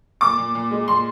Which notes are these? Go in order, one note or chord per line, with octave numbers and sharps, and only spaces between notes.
A#2 D6
A#2
A#2
G#3
A#2 C6